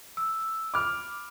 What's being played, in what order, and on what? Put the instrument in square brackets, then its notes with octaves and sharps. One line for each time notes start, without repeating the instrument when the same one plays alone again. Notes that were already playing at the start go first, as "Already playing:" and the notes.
[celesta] E6
[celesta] B5 [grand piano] D6 F6